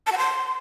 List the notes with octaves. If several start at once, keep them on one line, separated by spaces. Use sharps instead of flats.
A5
F#5
C6